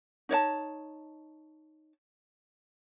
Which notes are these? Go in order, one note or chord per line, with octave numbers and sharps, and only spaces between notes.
D#4 C#5 D5 A5